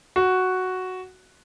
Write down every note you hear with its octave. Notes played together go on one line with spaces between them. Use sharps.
F#4